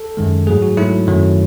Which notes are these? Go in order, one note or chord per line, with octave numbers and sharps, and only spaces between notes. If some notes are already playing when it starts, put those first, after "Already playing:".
Already playing: A4
F#2 D#3 G#3
G#2 F#3 A3 G#4
F#4
G#2 F#3 A3 E4
F#2 D#3 F#3 A3